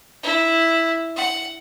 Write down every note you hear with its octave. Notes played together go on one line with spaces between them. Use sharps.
E4
F#5